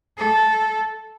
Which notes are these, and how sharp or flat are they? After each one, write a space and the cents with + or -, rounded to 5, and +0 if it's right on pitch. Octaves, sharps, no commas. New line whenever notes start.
A4 -10